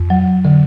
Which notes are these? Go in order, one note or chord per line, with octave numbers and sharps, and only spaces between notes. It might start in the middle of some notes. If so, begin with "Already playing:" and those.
Already playing: F2
F#3
D3